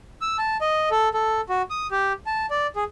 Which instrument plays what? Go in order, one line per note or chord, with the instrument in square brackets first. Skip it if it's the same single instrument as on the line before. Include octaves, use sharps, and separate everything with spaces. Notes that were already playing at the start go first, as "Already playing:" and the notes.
[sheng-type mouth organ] E6
A5
D#5
A4
A4
F#4
D#6
G4
A5
D5
G#4